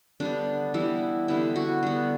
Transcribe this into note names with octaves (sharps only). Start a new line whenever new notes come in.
D3 G3 B3 D4
E3 G3 B3 E4
D3 G3 B3 E4
F#4
D3 G3 B3